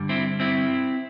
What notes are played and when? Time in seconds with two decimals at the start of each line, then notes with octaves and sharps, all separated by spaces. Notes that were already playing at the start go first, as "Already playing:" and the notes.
Already playing: G2 D3 G3
0.09 C4 E4
0.40 C4 E4